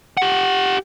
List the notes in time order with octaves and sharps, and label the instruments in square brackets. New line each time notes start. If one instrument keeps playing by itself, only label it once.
[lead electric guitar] G4 F#5